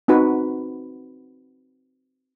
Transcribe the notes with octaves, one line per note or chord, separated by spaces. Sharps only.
C4 D#4 F#4 B4